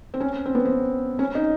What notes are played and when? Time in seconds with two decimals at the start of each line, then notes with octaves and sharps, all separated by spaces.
0.14 C4
0.20 C#4
0.46 C4
0.55 B3
0.65 C4
1.19 C#4
1.35 D#4